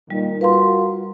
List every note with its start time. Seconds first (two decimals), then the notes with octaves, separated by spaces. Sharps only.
0.10 A#2 D#3 G3
0.41 F4 F#4 A#4 B4 F5 C6